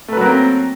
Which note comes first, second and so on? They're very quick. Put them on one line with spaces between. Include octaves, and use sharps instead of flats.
A3 B4 F#3 A#3 C4